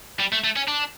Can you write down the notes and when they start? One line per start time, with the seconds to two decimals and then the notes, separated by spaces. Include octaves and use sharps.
0.20 G3
0.32 A3
0.44 A3
0.56 C#4
0.68 D4